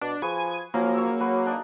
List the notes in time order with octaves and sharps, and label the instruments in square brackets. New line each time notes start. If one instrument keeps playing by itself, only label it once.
[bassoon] B2 [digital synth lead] D4
[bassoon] F3 [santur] G#4 B4 C#6 [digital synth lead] G#5
[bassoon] F3 [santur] F#3 C#4 C#6 [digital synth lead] A#3
[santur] C#6 E6
[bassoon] F#3 [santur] B4
[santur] D4 D#4 D5